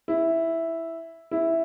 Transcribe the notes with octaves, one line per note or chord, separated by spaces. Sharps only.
E4
E4